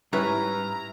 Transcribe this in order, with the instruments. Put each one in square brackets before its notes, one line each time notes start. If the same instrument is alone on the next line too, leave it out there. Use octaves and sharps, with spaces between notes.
[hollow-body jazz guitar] G#2 G3 [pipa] C#4 B4 [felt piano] E4 F6 [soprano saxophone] A#5